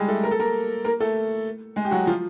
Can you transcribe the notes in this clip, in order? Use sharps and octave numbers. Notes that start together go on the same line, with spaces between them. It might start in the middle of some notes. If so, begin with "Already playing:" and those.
Already playing: G3 G#3 G4 G#4
A3 A4
A#4
A4
A#3 A#4
A#3 A#4
A3 A4
G#3 G#4
G4
F#3 F#4
F3 F4